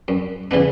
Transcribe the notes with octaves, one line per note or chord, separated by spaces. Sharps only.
F#2
C#3 E3 B3 D4